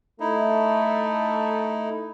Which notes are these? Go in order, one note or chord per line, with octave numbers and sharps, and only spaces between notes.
A3 D#4 E4